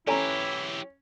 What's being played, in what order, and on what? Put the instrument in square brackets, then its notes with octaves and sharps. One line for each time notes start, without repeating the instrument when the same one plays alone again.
[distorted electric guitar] E3 G4 [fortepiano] C#4 [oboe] E4 [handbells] A4 G#5 A#5